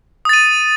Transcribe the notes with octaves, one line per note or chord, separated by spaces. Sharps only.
D#6 A6 D#7